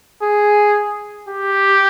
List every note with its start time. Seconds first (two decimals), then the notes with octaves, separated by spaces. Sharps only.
0.22 G#4
1.29 G4